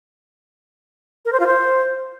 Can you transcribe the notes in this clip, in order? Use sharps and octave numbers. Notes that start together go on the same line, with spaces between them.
A#4
C5
F4
C5